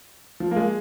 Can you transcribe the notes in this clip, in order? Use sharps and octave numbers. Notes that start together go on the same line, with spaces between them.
F3
A#3
G#3